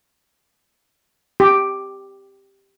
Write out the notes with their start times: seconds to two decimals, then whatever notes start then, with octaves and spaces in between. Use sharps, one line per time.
1.40 G4